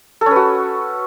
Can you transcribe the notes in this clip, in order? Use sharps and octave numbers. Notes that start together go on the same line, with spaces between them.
C#4 F#4 A4 B4